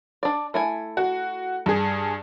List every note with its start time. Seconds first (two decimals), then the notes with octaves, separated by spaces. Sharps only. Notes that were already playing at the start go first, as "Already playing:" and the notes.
0.23 D4 D5
0.54 A3 E4 G#5
0.97 F#4
1.66 G2 G#4